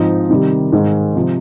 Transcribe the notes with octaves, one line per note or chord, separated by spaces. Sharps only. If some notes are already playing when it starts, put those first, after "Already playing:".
Already playing: G#2 F3 C4 D#4
C3 D#3 G3
G#2 D#3 G#3
C3 F3